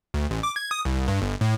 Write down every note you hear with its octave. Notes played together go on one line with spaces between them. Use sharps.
D2
A1
D6
G#6
D#6
C2
G2
G1
A2